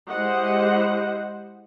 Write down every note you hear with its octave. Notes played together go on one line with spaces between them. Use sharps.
G#3 E4 G4 C5 D#5 F#5